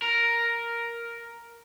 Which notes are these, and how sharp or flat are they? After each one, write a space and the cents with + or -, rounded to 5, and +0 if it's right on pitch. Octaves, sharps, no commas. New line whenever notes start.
A#4 +5